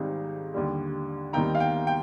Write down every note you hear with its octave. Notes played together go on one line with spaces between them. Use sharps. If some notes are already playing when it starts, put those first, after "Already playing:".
Already playing: G#1 G#2 G3 C4 D#4
D#2 D3 G3
D#2 D#3 G3 C4 D#4 G5 A#5
F5
G5
G5